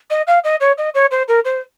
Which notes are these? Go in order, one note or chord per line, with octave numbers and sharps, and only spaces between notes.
D#5
F5
D#5
C#5
D#5
C#5
C5
A#4
C5